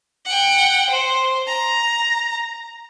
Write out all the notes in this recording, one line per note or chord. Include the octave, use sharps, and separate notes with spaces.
F#5 G5
C5
A#5